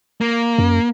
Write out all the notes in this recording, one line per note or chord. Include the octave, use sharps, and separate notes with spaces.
A#3
F#2